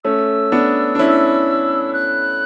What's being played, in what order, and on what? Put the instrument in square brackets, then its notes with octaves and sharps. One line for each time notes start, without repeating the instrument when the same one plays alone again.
[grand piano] A3 C#4 [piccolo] E6
[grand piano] B3 D4
D4
C#4 E4
[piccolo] F#6